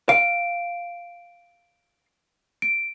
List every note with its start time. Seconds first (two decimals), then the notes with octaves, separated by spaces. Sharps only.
0.09 F5 D7
2.62 D7